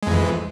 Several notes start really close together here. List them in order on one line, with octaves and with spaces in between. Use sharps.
G#3 F2 E3